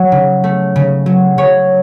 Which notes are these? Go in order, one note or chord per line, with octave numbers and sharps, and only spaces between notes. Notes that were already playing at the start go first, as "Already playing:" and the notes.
Already playing: F#3 C#5
C#3
A3
C#3
F#3
C#3 C#5